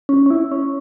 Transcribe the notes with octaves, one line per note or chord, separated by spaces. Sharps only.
C#4
C#4
E4
C#4